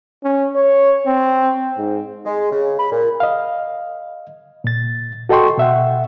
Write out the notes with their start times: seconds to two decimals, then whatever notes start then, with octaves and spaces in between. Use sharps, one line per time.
0.24 C#4
0.56 C#5
1.07 C4
1.78 G#2
2.26 G#3
2.52 C#3
2.79 B5
2.91 A#2
3.20 D#5 F5
4.64 A#2 A6
5.29 F#4 A4 D#5 G5 C6 C#6
5.58 B2 E5 F#5